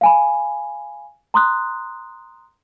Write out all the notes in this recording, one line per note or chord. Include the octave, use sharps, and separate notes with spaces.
F5 G#5 B5
A#5 C6 D#6 F#6